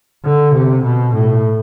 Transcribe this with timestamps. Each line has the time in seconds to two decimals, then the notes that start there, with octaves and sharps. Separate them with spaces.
0.25 D3
0.53 C3
0.84 B2
1.14 A2